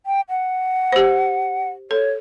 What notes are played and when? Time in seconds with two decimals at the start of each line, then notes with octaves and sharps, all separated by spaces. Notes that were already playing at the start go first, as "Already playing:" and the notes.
0.06 G5
0.29 F#5
0.92 G4 C5
1.91 A4 C#5